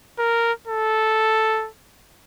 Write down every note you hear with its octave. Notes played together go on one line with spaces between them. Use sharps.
A#4
A4